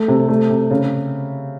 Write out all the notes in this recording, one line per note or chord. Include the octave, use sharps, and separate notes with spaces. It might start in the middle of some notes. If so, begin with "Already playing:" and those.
Already playing: A3
C3
A3
C3
C#3